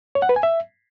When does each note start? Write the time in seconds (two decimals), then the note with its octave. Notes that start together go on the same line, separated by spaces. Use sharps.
0.15 C#5
0.22 F#5
0.29 B4
0.36 G#5
0.43 E5